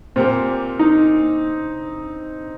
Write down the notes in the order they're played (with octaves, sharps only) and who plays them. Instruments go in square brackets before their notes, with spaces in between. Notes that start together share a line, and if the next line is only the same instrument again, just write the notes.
[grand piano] A#2 A#3 G4 A#4 [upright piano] C4
[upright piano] D#4